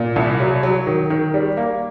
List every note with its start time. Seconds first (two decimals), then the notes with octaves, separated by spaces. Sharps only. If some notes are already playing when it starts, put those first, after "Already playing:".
Already playing: A#2
0.16 C2
0.40 F#3
0.63 F#3
0.87 D#3
1.10 D#3
1.34 G3
1.57 A#3